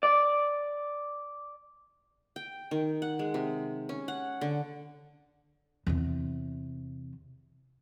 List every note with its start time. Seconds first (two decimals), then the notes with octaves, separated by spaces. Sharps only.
0.03 D5
2.36 G5
2.71 D#3
3.02 F#5
3.19 G#3
3.34 C3
3.89 C#4
4.08 F#5
4.41 D3
5.87 E2 C3